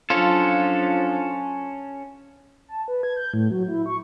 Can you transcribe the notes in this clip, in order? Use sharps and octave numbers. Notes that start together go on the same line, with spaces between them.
F3 F#3 C#4 D4 F4 A4
A5
B4
G#6
G6
A2
F#3
E4
C#6